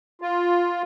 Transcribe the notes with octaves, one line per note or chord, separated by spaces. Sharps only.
F4